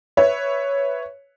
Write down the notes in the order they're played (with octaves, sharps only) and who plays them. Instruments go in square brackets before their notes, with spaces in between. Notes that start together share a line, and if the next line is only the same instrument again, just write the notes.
[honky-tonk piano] B4 C#5 E5